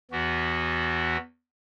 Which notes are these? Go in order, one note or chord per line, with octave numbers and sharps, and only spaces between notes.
E2 E3 B3 F#4